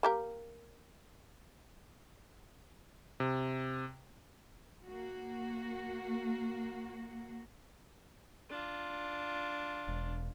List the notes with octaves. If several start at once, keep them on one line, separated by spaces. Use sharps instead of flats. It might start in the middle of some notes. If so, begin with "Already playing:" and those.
A#3 G4 A#4
C3
A#3 F#4
D4 F4
E1